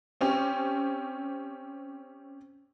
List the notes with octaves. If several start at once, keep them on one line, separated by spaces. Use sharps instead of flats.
C4 C#4 G4